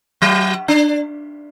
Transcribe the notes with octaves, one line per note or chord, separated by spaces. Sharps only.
F#3
D4